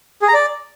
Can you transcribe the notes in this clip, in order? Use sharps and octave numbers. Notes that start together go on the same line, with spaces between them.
G#4
A#5
D5